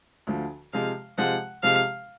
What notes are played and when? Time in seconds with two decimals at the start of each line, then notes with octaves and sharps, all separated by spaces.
0.27 D2 D3 F3
0.73 C3 F3 G#3 F5
1.18 C3 F3 G#3 F#5
1.63 C3 F3 G#3 F5